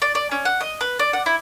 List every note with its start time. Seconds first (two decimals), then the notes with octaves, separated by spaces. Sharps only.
0.02 D5
0.15 D5
0.31 C#4
0.45 F#5
0.61 D#5
0.81 B4
0.99 D5
1.13 F#5
1.26 E4